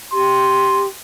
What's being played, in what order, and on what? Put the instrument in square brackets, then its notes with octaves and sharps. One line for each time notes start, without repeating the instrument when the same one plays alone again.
[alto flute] G4 [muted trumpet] C6